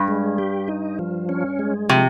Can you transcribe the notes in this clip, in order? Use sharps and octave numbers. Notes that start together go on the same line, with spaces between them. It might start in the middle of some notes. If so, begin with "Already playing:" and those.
Already playing: G2
G#3
G4
D#4
F3
C#4
G#3
C3 F3